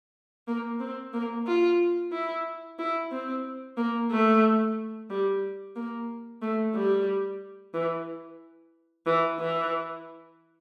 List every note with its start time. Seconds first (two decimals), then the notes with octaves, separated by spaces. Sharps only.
0.47 A#3
0.80 C4
1.13 A#3
1.47 F4
2.12 E4
2.79 E4
3.12 C4
3.77 A#3
4.11 A3
5.10 G3
5.76 A#3
6.42 A3
6.75 G3
7.74 E3
9.06 E3
9.40 E3